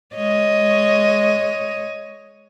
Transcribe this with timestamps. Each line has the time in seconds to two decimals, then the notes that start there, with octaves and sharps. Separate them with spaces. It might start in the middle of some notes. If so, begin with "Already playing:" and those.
0.16 G#3 C#5 D#5